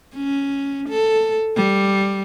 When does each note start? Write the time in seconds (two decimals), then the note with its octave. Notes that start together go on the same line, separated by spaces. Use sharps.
0.15 C#4
0.89 A4
1.56 G3